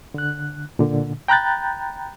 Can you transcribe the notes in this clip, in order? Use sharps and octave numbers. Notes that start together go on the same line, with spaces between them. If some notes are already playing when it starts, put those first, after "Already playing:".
D3 F#6
A#2 D3
G5 A#5 B5 F#6 G6 A6